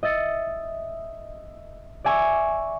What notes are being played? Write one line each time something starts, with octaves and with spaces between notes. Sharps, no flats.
D#5 E5 A6 C#7
D5 E5 G#5 C#6